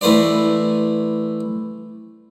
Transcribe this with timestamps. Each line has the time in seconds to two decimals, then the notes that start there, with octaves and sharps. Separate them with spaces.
0.01 E3 A3 B4 C5 D5